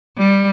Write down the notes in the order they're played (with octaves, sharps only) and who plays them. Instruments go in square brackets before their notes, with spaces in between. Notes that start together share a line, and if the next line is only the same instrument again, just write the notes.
[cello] G3